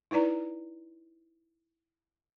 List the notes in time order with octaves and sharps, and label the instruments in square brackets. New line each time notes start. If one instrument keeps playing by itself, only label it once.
[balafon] D#4 E4 B4 D5 A#5